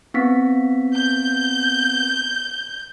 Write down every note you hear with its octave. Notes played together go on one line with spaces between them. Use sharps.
B3 C4 B6
G6